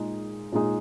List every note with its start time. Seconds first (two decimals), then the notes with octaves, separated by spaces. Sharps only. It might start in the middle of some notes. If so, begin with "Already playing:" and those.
Already playing: A#2 G#3 D#4 G#4
0.52 A#2 G#3 D#4 G#4